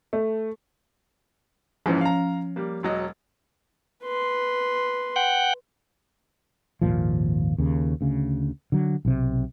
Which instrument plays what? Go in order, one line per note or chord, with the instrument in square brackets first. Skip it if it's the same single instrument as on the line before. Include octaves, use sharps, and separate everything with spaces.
[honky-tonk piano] A3
[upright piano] A#1 G#2 E3 [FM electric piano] F3 C#4
[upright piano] F5 A#5
G3 A#3
E1 F#3 D#5
[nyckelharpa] B4 C6
[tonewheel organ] F#5 G5
[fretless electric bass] G#1 D#2 A#2 F3
D#2 C#3
D2 C#3
D3 F#3
B1 C3